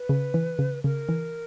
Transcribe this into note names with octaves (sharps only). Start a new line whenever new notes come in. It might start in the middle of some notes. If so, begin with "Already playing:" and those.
Already playing: B4
C#3
E3
C#3
C#3 A#4
E3